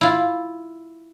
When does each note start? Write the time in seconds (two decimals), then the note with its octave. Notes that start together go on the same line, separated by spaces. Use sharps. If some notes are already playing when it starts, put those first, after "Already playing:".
0.01 E4 F4